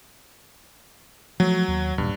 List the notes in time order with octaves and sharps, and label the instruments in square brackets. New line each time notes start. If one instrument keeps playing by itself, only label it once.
[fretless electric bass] F3 A3 [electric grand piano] F#3
[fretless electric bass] D#2
[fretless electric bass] D#1 A#2 [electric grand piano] G2